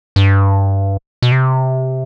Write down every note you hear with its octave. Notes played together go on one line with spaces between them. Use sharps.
G2
B2
C3